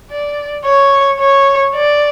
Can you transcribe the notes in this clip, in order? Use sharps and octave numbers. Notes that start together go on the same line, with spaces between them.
D5
C#5
C#5
D5